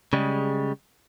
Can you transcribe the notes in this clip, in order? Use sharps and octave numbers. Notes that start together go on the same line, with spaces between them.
C#3 G3 G#3